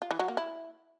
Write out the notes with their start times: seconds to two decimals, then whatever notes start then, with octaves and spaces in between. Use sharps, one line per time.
0.02 F4
0.11 E3
0.19 F#3
0.28 A#3
0.37 E4